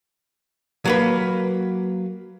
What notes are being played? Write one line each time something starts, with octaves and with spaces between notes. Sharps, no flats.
F#3 A#3 B4